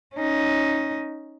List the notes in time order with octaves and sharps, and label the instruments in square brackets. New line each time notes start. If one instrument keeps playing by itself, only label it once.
[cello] C#4 D#4